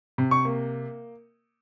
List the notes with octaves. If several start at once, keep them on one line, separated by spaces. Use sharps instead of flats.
C3
C#6
A#3